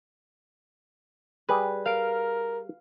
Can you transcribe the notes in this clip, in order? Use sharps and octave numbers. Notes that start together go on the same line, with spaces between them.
G3 G#4 B4
A#4 F5 D7